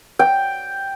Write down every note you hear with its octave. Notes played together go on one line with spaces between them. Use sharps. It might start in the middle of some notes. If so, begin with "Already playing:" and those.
G5